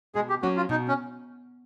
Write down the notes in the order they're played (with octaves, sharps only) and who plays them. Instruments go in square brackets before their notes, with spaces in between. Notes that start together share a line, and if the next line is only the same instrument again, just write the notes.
[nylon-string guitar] B2 [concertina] G#3 G#4
[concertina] G4
[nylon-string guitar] F#3 A#3 C#4 [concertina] F#4
[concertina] F4
[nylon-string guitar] B2 [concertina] D#4
[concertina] C#4